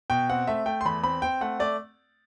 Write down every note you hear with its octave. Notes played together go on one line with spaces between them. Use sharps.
B2 G5
C4 F#5
A3 E5
A3 G5
C6
E2 B5
C4 B5
C4 G5
A3 F#5
A3 D5